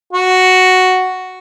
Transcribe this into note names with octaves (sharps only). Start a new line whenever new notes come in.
F#4